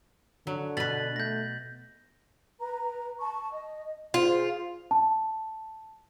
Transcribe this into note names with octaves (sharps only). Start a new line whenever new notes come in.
D3 F#3
B2 B4 A6 B6 F#7
A3 G6 A#6
B4 A#5
A5 C#6
D#5
F4 G#4 C5
A5